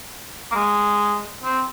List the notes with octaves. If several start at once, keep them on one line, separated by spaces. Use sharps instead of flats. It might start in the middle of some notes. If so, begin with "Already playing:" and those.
A#3
G#3
C4